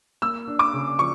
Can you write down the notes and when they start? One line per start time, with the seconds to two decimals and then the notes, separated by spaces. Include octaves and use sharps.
0.22 A#3 E6
0.47 D4
0.59 D6
0.73 C#3
0.99 F3 C#6